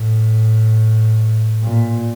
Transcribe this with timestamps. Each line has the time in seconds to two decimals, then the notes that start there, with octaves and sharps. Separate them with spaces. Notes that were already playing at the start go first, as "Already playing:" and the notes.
Already playing: A2
1.64 A#2